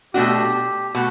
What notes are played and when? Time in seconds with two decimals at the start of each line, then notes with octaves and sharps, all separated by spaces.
0.14 B2 A3 D4 F#4 G4
0.95 B2 A3 F#4